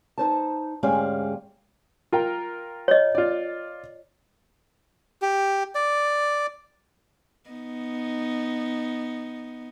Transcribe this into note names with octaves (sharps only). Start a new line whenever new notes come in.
D#4 C5 A5
D2 G#2 G#3 C#4 G4 F5
F4 A#4 G5
C#5 D#5
F4 D5
G4
D5
B3 D#4